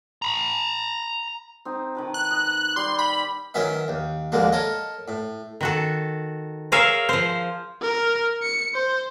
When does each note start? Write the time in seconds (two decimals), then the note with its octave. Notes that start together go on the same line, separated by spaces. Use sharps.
0.22 A#5 B5
1.65 C4 D#4
1.95 D#3 B4 A5
2.14 F#6
2.30 D#5
2.76 G3 C6
2.99 B5
3.54 D#3 F#3 B3 C#4 E5
3.88 D#2
4.32 A#1 D#2 D3 G#3 A#3
4.52 A4 A#4 C#5 D#5
5.08 A2
5.61 D#3 F#4 A4
6.72 G#4 A#4 C#5 E5 F5
7.09 F3 C5
7.82 A#4
8.43 C#7
8.74 C5